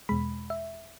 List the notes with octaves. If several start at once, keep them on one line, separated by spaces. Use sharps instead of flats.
E2 B2 G#3 B5
E5